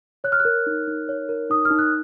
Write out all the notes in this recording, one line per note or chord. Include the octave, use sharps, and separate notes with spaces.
C#5 F#6
F6
F#6
A#4
D#4
D#4
C#5
A#4
D#4 D#6
F6
D#4
F#6